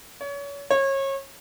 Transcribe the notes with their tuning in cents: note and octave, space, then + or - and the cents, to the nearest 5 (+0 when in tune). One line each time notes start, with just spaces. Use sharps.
C#5 +30
C#5 -30